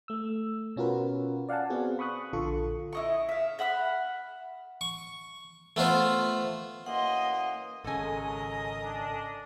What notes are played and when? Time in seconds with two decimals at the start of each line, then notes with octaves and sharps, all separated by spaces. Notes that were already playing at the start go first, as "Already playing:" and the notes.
0.08 A3 E6
0.76 B2 C#4 F4 F#4 A#4 B4
1.49 D5 F5 F#5 G#5 A5
1.70 B3 C4 F#4 G#4
1.99 B5 C#6 D#6 F#6
2.33 A#1 D3 F4 A4 C#6
2.93 E4 D#5 C#6
3.29 E5 F5
3.59 E5 F#5 B5 F6
4.81 C#6
5.76 A3 B3 F4 C5
6.86 F#2 E3 A#3 D#5 F#5 C6
7.84 G#1 C#3 F#3 G#3 A4 A#4 D#5 G#5
8.84 D4